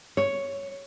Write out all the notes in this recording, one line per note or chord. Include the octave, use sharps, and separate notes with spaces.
C#5